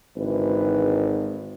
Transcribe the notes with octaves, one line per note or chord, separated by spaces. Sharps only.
G#1 D3 E3 B4